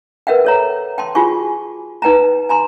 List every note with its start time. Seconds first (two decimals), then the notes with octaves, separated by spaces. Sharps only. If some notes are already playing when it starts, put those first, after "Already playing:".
0.27 A#4 B4 E5 F#5 G5
0.45 A4 C#5 A#5
0.98 G5 A5 C6
1.15 F4 F#4 G#4 G#5 C#6
2.02 D#4 B4 G5 A5 A#5
2.49 G#5 A#5 C6